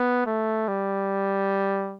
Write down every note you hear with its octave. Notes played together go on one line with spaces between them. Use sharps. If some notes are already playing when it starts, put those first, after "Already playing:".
Already playing: B3
A3
G3